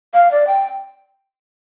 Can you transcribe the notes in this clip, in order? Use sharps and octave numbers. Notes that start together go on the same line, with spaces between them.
F5
D5
G5